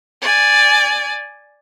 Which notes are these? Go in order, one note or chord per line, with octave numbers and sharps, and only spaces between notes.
D5 G#5